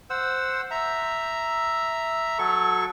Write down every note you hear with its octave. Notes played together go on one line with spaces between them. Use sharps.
C5 F#5 E6
E5 A#5
F#3 A4 C#6